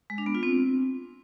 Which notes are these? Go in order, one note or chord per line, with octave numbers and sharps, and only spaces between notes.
G#3
D4
B3
F4
C4